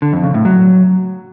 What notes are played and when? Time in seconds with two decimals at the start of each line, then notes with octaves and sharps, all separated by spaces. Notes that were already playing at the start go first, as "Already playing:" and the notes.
0.02 D3
0.13 F2
0.24 C#3
0.34 A2
0.45 F#3